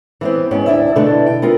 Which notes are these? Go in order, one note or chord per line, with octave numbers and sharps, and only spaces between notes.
E3 B3 C4
G#2 B3 C#4 G5
D2 D4 E4 E5
B2 D3 A3 B3 D4 E4
G5
B3 C4 F4 A#4